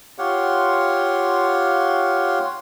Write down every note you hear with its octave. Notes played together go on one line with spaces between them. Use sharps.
F4 G4 C#5 F5 F#5 C6